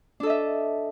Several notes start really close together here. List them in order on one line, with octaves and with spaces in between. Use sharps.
D4 A4 D#5 E5